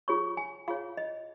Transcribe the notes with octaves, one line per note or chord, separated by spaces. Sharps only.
F4 G#4 C#5 C#6
G#5
F4 G#4 C#5 F5
D#5